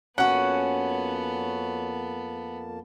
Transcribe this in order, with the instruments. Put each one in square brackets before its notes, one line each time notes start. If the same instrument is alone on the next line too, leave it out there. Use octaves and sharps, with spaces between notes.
[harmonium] F2 A#3 A5 [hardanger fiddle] B3 [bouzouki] C#4 F#4 [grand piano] F#5